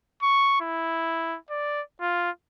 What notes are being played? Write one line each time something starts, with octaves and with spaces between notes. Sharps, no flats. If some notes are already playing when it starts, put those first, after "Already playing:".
C#6
E4
D5
F4